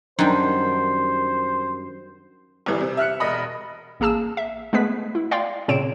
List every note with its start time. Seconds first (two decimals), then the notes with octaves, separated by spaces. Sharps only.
0.19 F#2 D#3 G3 D4 C5
2.66 G1 E3 G3
2.81 C3
2.97 E5 F6 F#6 C#7
3.20 E1 D#5 B5
4.00 A1 A#3 G#4 A5 E6 E7
4.37 E5
4.73 G#3 A3 B3 B4 B6
5.15 E4
5.31 D5 F5 G5 C6
5.68 A#2 C#3 C4 C#5 D7 E7